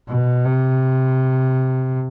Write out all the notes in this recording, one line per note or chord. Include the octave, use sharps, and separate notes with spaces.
B2
C3